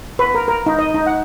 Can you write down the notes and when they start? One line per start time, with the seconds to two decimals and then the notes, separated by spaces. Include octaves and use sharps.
0.19 B4
0.35 A#4
0.48 A#4
0.66 D#4
0.79 D#5
0.94 D#4
1.06 F#5